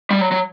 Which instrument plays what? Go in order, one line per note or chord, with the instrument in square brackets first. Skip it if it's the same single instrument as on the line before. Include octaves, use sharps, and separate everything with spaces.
[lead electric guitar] G3
F#3
F#3